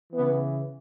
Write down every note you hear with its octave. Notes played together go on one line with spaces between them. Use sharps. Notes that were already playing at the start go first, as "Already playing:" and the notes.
C#3 E3 B3